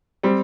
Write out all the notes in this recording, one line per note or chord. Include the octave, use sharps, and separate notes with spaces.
G3 C4